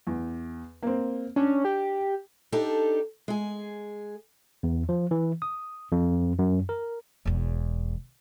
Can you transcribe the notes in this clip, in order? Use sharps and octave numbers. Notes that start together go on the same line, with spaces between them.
E2
A#3 C4
C#4 D4
G4
D4 D#4 G4 A4
G#3 G#4
E2
F3
E3
D#6
F2
F#2
A#4
E1 E2